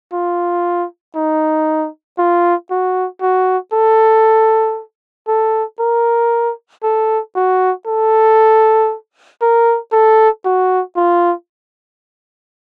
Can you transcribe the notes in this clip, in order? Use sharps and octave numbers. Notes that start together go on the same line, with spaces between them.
F4
D#4
F4
F#4
F#4
A4
A4
A#4
A4
F#4
A4
A#4
A4
F#4
F4